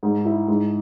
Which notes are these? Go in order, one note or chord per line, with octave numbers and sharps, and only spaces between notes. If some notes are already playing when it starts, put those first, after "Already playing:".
G#2
E4
G#2